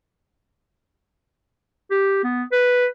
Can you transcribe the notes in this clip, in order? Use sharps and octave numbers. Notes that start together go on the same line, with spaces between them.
G4
B3
B4